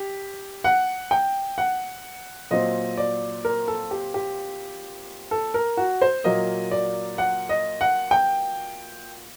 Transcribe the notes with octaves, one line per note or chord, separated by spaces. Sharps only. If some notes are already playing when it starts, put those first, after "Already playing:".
Already playing: G4
F#5
G5
F#5
A#2 F#3 C4 D#5
D5
A#4
A4
G4
G4
A4
A#4
F#4
C5
A#2 F#3 A#3 D#5
D5
F#5
D#5
F#5
G5